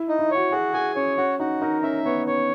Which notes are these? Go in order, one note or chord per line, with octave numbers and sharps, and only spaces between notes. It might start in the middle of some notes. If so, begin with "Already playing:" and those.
Already playing: E4
D#4
E4
F#4 C#5
F#4 G#4
G#4 G#5
C#4 C#5
C#4 F#4
D#4 F#4
D#4 A#4
C#4 E5
B3 C#5
C#4 C#5